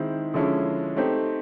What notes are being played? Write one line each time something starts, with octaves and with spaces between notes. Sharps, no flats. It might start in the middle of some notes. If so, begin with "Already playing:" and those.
Already playing: D#3 G#3 C4 E4
D3 F3 G#3 C#4 E4
A3 C4 D#4 G4